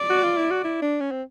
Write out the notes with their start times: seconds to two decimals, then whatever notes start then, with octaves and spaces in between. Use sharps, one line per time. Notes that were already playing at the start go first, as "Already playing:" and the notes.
Already playing: D5
0.10 F#4
0.23 F4
0.37 E4
0.51 F#4
0.64 E4
0.82 D4
1.01 C#4
1.11 C4